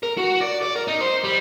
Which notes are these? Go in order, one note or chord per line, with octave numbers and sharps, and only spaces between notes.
A#4
F#4
D5
D5
A#4
D#4
C5
G3